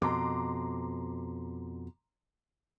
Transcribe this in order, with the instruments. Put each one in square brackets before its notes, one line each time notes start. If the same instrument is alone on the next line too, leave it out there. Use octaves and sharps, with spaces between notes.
[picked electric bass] F2 B2 [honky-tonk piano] A#5 C6 D6